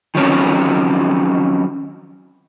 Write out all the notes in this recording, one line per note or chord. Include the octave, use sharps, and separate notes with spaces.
D#3 F3 F#3 C4 C#4